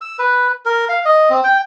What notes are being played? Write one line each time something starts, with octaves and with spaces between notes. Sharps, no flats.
E6
B4
A#4
F5
D#5
C4
G5